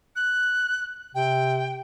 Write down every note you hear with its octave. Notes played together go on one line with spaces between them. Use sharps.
F#6
C3 G5